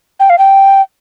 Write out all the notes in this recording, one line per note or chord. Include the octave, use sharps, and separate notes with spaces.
G5
F5
G5